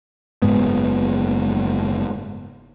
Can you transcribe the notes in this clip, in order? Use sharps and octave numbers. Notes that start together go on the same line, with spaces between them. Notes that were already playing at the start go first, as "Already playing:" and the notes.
F#1 G#2 G#3 B3